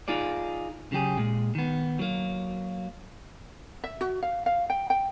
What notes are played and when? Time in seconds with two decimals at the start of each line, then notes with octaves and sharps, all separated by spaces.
0.08 D#4 F4 G#4 D5
0.92 C#3 F#3 G4 G#4
1.18 A#2 G#3
1.55 D#3 B3
1.99 F#3 A#3
3.84 E5
4.01 F#4
4.22 F5
4.46 F5
4.70 G5
4.90 G5